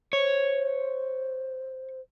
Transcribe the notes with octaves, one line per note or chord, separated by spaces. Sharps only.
C5 C#5